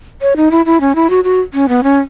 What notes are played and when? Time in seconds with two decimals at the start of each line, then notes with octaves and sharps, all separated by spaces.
0.22 C#5
0.36 D#4
0.51 E4
0.66 E4
0.81 C#4
0.95 E4
1.10 F#4
1.24 F#4
1.54 C#4
1.69 B3
1.83 C#4